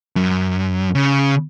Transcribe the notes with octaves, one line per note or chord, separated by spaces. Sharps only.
F#2
C#3